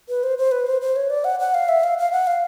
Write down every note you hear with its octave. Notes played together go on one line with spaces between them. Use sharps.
B4
C5
C5
B4
C5
C5
C#5
D5
F#5
F#5
F5
E5
F5
F5
F#5
F5